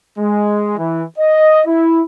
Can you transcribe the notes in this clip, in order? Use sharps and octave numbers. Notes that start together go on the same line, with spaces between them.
G#3
E3
D#5
E4